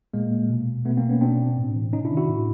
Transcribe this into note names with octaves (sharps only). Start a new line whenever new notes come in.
A#2 G#3 A#3
B2
B2 A3 B3
A#3 C4
B3 C#4
B2 C4 D4
A2
E3
C3 C#4 D#4
D4 E4
D#3
E4 F#4
A2